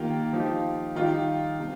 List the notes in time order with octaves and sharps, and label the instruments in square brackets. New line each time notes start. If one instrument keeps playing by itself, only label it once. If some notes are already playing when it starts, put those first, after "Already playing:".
Already playing: [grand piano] D#3 A#3 G4 [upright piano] F4
[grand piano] F3 D#4 G4
[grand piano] D#3 G3 D#4 G4 [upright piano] F4
[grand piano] C3